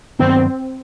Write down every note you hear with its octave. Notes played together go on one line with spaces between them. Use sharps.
G2 D#3 F#3 B3 C4